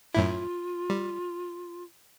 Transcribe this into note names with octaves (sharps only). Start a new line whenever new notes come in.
F#2 A2 E4 F4
G3